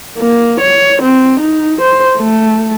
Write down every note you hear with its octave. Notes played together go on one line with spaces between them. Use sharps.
A#3
C#5
C4
D#4
C5
A3